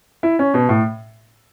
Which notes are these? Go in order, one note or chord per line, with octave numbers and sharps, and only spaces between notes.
E4
C#4
B2
A2